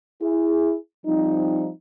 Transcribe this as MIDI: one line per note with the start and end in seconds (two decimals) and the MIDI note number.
0.22 0.75 64
0.22 0.75 68
1.06 1.69 53
1.06 1.69 55
1.06 1.69 60
1.06 1.69 63